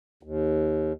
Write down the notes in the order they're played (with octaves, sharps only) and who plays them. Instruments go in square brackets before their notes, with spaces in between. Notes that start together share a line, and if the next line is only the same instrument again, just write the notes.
[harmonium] D#2